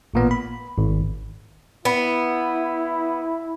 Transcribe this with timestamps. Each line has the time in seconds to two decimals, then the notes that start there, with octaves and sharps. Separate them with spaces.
0.14 A1 A#2 B3
0.31 B5
0.78 G#1
1.85 B3 E4